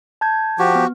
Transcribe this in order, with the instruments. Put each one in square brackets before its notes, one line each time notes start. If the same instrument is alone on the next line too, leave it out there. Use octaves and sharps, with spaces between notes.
[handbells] A5 G6 G#6
[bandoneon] F3 G4 [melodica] F#4
[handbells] B3